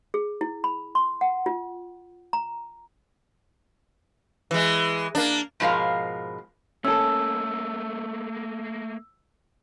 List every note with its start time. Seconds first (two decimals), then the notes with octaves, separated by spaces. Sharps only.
0.14 G#4
0.41 E4
0.64 B5
0.95 C6
1.21 F#5
1.46 F4
2.33 A#5
4.51 E3 G#3
5.15 A#3 D4
5.60 G#2 B2 F3 G#3 A#4 F5
6.85 A3 A#3 C#4 A4 E6